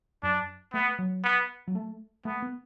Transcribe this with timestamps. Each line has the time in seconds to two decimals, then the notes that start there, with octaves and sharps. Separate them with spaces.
0.23 F#2 D4
0.74 A3 B3
0.99 F#3
1.24 B3
1.68 F#3
1.75 A3
2.25 A3 B3
2.42 B3